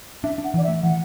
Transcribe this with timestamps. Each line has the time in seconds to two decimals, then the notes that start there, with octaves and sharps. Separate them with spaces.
0.24 D4 E5
0.38 D4
0.44 F#5
0.54 E3 D5
0.64 E5
0.68 A3
0.83 E3 F#5